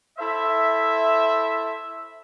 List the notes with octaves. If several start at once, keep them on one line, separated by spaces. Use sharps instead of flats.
E4 A4 C5 E5